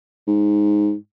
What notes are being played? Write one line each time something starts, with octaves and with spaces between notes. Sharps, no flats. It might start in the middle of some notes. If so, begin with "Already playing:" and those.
G#2